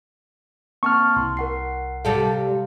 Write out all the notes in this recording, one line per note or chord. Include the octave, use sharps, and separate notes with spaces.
A#3 C4 A5 C#6 F6
C2 C6
A#4 F#5 C7
C3 G3 A4 F5